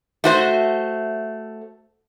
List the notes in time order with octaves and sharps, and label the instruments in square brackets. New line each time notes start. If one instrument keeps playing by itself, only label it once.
[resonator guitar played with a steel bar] A3 F#4 C5